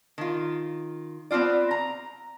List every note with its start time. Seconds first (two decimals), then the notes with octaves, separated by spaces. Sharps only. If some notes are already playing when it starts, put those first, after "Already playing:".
0.18 D#3 F4
1.31 B3 C4 D#4 F4 D5
1.71 A#5